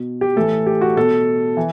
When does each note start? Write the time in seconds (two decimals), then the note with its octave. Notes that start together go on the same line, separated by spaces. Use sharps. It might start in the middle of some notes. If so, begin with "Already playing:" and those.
Already playing: B2
0.21 G4
0.36 A2 E3 A4
0.66 G4
0.81 F#4
0.96 B2 A4
1.57 E3